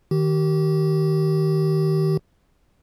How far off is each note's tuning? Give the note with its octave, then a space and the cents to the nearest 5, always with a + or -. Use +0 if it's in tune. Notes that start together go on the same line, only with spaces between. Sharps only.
D#3 +0 G4 -30